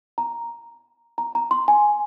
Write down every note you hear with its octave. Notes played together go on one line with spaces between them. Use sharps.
A#5
A#5
A#5
C6
G#5